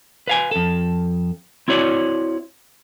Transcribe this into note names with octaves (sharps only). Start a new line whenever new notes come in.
B4 F5 G#5
F2 A4
C4 E4 F#4 C#5 D5